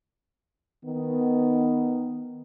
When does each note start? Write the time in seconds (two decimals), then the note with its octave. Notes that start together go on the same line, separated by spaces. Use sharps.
0.86 D#3 B3